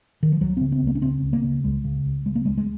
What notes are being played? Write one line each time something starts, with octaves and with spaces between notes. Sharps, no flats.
D#3
F3
C#2 F#3
C#3 C4
C4
C#2 A#3
C#4
C#3 C4
C#2
A#3
C#3
C#2 G#3
C#3
C#2
C#3 G#3
A#3
C#2 G#3
G#3